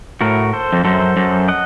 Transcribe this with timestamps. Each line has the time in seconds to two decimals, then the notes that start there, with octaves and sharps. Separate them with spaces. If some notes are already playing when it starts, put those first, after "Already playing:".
0.21 A2 F#4 A#4
0.53 A4 C5
0.73 F2
0.85 F#2 A4 C5
1.17 F#2
1.48 D#5 F#5